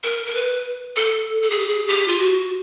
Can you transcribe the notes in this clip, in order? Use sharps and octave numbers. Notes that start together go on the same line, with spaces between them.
A#4
A#4
B4
A4
A4
G#4
G4
G#4
G4
F4
F#4